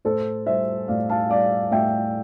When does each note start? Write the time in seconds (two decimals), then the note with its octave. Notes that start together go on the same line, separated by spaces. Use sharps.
0.05 A2 A4 C5
0.46 G3 C5 E5
0.88 A2 D5 F5
1.10 F5 A5
1.30 G3 D5 F5
1.71 A2 E5 G5